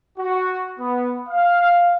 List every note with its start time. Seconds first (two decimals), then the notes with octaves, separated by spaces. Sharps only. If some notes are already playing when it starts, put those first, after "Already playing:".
0.18 F#4
0.79 B3
1.29 F5